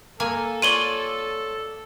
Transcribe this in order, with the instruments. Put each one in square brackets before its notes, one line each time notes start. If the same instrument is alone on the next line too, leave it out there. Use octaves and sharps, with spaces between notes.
[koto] A#3 G#5 [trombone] A4
[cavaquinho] F4 C#5 D5 [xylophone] D#7 F#7 G7